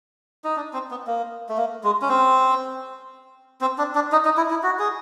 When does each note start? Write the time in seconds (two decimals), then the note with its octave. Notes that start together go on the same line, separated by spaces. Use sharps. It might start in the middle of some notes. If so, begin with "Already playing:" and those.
0.44 D#4
0.56 D4
0.73 C4
0.91 B3
1.07 A#3
1.49 A3
1.58 A#3
1.84 G#3
2.02 C#4
2.09 C4
3.61 C4
3.78 D4
3.95 D4
4.12 D#4
4.25 D#4
4.37 E4
4.50 E4
4.63 F#4
4.79 G#4